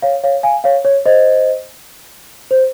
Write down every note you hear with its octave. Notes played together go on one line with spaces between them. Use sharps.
C#5 F5
C#5 F5
F5 G#5
C#5 F5
C#5
C5 D#5
C5